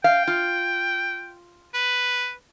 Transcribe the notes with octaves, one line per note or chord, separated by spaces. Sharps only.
F5 G5
F4
B4